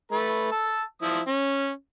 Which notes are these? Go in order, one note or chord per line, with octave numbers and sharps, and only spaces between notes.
A3 B4
A5 E6
F3 E4 D#6
C#4